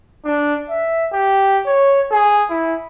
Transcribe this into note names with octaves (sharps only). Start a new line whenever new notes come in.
D4
E5
G4
C#5
G#4
E4